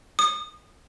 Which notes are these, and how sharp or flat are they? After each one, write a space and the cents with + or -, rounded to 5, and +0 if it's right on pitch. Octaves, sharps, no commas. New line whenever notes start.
D#6 -30